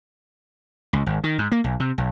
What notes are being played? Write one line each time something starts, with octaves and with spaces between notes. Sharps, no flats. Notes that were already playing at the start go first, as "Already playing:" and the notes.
C#2
G#1
D#3
G#2
A#3
B1
C3
B1